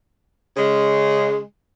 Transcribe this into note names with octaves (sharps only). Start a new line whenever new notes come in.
C#3 G#3